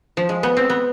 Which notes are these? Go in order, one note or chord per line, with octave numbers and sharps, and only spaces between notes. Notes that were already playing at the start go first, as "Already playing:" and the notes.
F3
G#3
B3
C4
B3